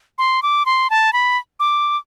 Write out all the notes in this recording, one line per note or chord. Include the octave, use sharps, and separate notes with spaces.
C6
D6
C6
A5
B5
D6